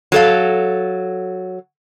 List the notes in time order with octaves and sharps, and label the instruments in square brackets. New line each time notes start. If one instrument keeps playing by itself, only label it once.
[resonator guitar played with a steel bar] F#3 A4 F5